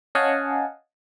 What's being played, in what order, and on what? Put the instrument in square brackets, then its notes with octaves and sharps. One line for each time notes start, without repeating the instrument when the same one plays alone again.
[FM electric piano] C#4 D#5 F5 F#5 G#5 A5